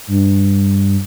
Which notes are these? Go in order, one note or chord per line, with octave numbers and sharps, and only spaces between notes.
G2